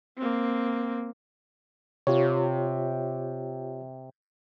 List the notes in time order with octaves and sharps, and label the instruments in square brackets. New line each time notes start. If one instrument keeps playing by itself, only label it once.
[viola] A#3 C4
[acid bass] C3 [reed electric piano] F4 G4 C#5